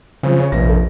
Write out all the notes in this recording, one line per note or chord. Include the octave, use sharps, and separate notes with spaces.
C#3 F3 C4
C#5
F1 A#1 A#6
A4